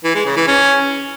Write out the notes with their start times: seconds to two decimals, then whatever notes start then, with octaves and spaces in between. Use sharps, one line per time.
0.04 E3
0.15 G#3
0.26 C#3
0.37 E3
0.48 C#4